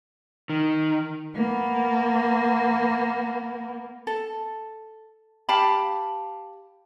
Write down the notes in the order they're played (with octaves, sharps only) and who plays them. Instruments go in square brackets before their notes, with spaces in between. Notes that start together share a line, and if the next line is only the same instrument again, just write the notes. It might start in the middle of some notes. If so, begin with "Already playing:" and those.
[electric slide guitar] D#3
[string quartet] A#3 B3
[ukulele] A4
G4 F5 A5 B5